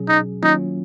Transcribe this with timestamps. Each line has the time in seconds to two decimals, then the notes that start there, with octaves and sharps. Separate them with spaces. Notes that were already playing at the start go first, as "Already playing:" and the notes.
Already playing: B2 F#3 C#4 G#4
0.08 D#4
0.42 D#3 F#3 A#3 C#4 D#4 F4